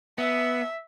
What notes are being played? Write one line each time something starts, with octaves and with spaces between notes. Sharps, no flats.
B3 E5